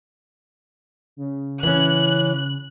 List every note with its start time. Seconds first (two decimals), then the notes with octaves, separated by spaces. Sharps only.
1.16 C#3
1.63 E3 C#4 F#6